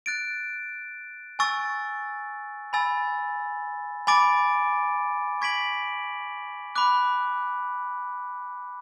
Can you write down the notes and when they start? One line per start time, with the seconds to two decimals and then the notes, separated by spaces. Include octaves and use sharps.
0.06 F#6 A6 D7
1.39 G#5 C#6 E6 A6
2.73 G#5 B5 E6 A6
4.07 G#5 B5 D6 A6 D7
5.41 C#6 G#6 B6 D7 F#7
6.76 B5 D6 F#6